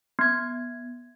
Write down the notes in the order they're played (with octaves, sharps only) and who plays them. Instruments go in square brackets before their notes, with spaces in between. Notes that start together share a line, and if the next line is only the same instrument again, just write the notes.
[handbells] B3 G#6